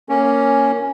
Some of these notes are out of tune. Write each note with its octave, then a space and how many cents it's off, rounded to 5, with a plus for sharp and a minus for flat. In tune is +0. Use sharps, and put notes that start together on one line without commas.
A#3 +0 C#4 +0